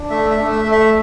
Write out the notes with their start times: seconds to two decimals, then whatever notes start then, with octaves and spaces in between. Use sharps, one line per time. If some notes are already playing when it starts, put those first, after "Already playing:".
Already playing: D4
0.10 A3 E5
0.30 E5
0.38 A3
0.51 E5
0.64 A3
0.72 E5